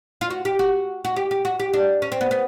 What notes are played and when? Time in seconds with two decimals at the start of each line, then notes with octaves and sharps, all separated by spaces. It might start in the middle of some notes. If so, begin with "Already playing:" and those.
0.21 F4
0.30 F#4
0.45 G4
0.59 F#4
1.05 F#4
1.16 G4
1.31 G4
1.45 F#4
1.60 G4
1.74 D4
2.02 C#4
2.12 C4
2.21 B3
2.31 B3